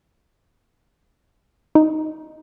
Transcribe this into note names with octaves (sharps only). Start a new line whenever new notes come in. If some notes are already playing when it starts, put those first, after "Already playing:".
D#4